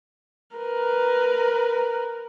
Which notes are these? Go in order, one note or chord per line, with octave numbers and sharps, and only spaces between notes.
A#4 B4